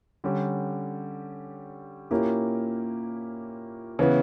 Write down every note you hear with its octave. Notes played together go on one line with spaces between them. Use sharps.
D3 G3 C#4 G4
A#2 A#3 C#4 E4 G4
C#3 E3 B3